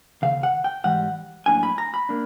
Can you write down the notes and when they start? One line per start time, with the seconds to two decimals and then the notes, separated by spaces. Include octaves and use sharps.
0.22 D#2 C#3 F5
0.43 F#5
0.64 G5
0.84 G#2 E3 G3 F#5
1.46 A2 F#3 A#3 D4 G#5
1.63 B5
1.78 A#5
1.94 B5
2.09 A#3 D4